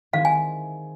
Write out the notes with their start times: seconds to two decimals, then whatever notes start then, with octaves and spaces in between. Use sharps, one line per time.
0.13 D#3 G#3 C4 E4 G#4 F5
0.25 G#5